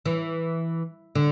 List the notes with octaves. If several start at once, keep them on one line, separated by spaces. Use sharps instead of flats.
E3
D3